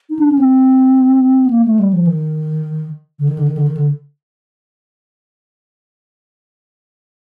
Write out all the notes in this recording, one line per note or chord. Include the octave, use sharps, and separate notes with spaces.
D#4
D4
C#4
C4
B3
A#3
A3
G3
F3
D#3
D3
D#3
D3
D#3
D3
D#3
D3